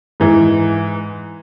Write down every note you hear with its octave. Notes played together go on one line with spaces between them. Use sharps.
G#2 E3